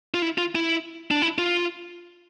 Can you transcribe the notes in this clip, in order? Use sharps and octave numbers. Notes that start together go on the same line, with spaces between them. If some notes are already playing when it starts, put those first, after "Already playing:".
F4
E4
F4
E4
D4
E4
F4